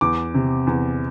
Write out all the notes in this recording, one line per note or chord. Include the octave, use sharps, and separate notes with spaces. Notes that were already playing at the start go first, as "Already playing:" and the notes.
E2 D6
C3
E2